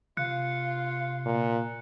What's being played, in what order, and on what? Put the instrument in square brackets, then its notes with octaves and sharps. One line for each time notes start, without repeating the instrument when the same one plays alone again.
[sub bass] C3 [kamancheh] F4 F5 [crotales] F#6 C#7
[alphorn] A#2